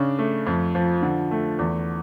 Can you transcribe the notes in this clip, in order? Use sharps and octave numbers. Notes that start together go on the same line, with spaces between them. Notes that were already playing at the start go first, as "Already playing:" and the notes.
Already playing: C#3 D4
A3
F2
F3
D3
A3
E2